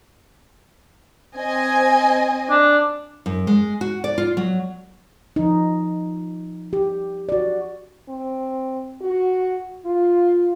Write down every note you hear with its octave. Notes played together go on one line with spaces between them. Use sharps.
C4 D#5 G#5
D4
F#2
G#3
F#4
D5
F4
F#3
F3 D#4
G4
F#4 D5
C4
F#4
F4